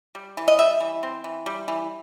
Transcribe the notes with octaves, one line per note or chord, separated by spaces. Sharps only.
G3
E3
D#5
G3 E5
E3
C4
E3
G3
E3